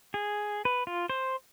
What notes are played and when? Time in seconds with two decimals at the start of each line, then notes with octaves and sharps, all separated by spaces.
0.14 G#4
0.65 B4
0.87 F4
1.10 C5